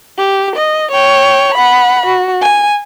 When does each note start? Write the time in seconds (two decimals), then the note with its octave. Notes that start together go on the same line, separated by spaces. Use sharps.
0.18 G4
0.56 D#5
0.91 C#5 G5
1.54 F#5 B5
2.06 F#4
2.41 G#5